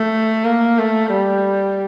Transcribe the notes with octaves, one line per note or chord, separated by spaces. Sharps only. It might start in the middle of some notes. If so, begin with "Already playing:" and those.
Already playing: A3
A#3
A3
G3